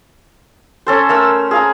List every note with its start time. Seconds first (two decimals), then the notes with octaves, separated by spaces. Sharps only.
0.87 C#4 A4 C5
1.09 A3 A#4 E6
1.51 G#4 F5 A#5